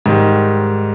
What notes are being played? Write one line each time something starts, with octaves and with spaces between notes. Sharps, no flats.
G#2 D#3 G3